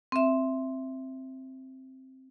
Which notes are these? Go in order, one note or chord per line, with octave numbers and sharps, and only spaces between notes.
C4 E5